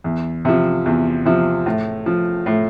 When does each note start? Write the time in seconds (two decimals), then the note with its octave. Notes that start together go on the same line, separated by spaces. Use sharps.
0.04 E2
0.45 C3 F3
0.86 E2
1.26 C3 F3
1.66 A2
2.06 F3
2.46 A2